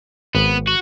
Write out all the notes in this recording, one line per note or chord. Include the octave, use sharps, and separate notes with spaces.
G#1 B3
F#4